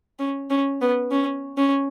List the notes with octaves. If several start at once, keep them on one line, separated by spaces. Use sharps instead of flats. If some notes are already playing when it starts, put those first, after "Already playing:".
C#4
C#4
B3
C#4
C#4